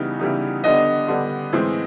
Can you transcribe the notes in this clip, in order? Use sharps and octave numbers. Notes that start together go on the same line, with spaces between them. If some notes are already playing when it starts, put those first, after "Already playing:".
Already playing: C#3 E3 G3 B3 D#4
C#3 E3 G3 B3 D#4
D3 G3 B3 D4 D#5
D3 G3 B3 D4
A2 E3 G#3 C4